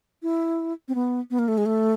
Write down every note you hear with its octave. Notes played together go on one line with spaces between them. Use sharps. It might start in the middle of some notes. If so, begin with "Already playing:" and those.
E4
C4
B3
B3
A#3
A3
G#3
A3